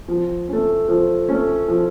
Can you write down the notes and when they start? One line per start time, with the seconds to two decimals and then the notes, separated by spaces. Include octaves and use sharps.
0.08 F3
0.48 A3 C#4
0.88 F3
1.29 A3 C#4
1.68 F3